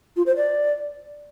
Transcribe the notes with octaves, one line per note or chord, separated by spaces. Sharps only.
F4
C5
D5